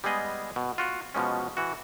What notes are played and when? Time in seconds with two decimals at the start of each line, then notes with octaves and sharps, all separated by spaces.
0.04 G3 G#3 B3 G#4 D#5
0.56 B2
0.78 F4 F#4
1.14 B2 F3 G#3 C#4
1.57 E3 F#4